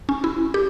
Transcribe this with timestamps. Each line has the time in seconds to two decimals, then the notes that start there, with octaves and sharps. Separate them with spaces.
0.09 C#4
0.24 E4
0.54 G4